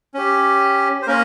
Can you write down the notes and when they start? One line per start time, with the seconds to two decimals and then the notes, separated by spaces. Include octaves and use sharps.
0.14 C#4 G4
1.02 C5
1.07 A#3 C#4 A#4